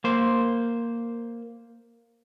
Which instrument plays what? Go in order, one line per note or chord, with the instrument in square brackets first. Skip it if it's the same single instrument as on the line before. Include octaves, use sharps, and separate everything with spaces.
[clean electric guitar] A#3 C5